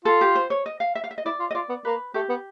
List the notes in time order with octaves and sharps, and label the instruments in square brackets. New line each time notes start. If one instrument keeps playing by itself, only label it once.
[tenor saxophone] F4 [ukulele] A4
[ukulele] G4
C5
C#5
D#5
F5
E5
F5
E5
D#5
[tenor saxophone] E4 [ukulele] D5
[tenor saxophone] F4
[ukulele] D#5
[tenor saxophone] F4 [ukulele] D5
[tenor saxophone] B3
[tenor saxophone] A#3 [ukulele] B4
[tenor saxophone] A3 [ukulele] G4
[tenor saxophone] B3